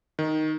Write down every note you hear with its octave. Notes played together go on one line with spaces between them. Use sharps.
D#3